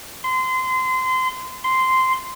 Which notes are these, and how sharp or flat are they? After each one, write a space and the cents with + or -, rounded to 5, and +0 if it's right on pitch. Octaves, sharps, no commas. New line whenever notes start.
C6 -25
C6 -10